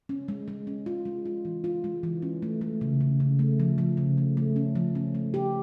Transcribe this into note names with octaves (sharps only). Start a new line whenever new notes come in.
C#4
G#3
G#3
C#4
F4
G#3
F4
E3
F4
G#3
E3
C#4
A3
A3
C#3
C#3
C#3
A3
F3
F3
C#3
A3
A3
C#4
F3
C#4
A3
G4